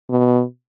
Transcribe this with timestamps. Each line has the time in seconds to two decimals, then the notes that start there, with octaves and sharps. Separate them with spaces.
0.10 B2